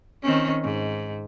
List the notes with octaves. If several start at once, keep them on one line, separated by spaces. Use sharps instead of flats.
D#3 C4 C#4
G#2